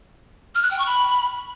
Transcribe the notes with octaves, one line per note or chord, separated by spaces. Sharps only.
F6
F#6
G5
C#6
B5